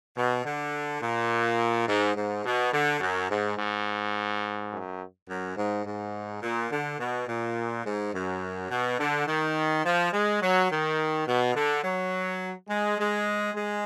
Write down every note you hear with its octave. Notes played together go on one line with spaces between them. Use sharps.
B2
D3
A#2
G#2
G#2
B2
D3
F#2
G#2
G#2
F#2
F#2
G#2
G#2
A#2
D3
B2
A#2
G#2
F#2
B2
D3
D#3
F3
G#3
F#3
D#3
B2
D3
F#3
G#3
G#3
G#3